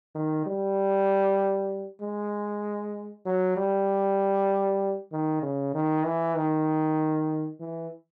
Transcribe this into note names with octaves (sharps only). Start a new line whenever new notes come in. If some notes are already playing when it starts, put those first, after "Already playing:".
D#3
G3
G#3
F#3
G3
D#3
C#3
D#3
E3
D#3
E3